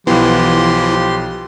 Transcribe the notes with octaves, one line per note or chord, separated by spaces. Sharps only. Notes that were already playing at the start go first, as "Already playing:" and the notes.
B1 E3 F3 B3 G4 C6